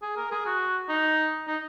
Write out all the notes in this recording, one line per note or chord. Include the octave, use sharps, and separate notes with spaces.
G#4
A#4
G#4
F#4
D#4
D#4